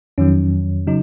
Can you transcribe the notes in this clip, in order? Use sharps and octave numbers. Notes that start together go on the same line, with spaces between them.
F2 D#3 F#3 C#4
C#3 F#3 D#4